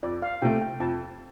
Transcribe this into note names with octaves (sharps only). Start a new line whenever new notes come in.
F2 D5
F5
C3 A3 G5
G5
F2 A5